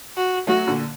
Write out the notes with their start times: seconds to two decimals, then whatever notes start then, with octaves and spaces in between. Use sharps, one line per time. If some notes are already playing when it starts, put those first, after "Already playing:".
0.17 F#4
0.47 F#3 A3 F#4
0.67 A#2 D3